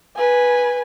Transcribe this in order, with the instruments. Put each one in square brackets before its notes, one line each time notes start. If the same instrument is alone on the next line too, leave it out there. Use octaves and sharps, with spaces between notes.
[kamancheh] B4 G#5